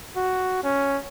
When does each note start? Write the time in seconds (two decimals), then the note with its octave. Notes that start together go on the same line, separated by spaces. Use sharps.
0.16 F#4
0.63 C#4